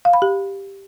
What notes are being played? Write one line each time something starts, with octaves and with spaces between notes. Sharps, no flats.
F5
B5
G4